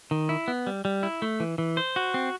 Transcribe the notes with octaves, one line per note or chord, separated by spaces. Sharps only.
D#3
E4
B3
G3
G3
E4
A3
E3
E3
C5
F#4
C4